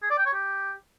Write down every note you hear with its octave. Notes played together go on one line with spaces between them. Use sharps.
G#4
D5
G5
C#5
G4